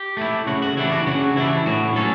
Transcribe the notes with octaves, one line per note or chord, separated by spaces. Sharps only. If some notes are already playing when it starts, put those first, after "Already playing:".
Already playing: G4
A3 E4
C#3 F#4
F#4
E3 G3 D4 E4
F#4
C#3 F#4
E3 G3 D4 E4
A2 F#4
F#3 C#4 A4